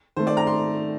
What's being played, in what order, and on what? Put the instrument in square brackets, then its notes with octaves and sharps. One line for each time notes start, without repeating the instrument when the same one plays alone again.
[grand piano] D#3 A3 C4 [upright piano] C5
[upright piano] D5
A#5
C6